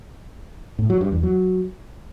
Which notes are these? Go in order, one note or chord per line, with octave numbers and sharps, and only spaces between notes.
A2
F#3
G2
E2
F#3